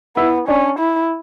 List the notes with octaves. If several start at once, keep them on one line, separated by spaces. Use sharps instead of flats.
B3 E4
C#4 D4
E4